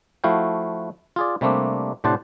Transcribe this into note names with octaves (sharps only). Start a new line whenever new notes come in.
F3 A3 E4 F#4 F5 G5
F4 G#4 D5
C3 G3 A3 A#3 C4 D4
A2 C3 D4 C5 F#5 A5